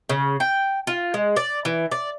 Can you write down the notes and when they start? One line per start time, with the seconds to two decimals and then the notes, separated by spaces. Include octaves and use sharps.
0.09 C#3
0.40 G5
0.87 F4
1.14 G#3
1.36 D5
1.65 E3
1.91 D5